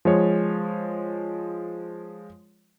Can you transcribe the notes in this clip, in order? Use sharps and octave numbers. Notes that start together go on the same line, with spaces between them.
F3 G#3 C#5